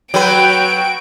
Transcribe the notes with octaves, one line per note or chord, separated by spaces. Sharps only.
F#3 F#4 B4 G5 D7